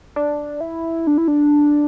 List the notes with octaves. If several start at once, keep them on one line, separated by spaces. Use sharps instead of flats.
D4
E4
D4
E4
D4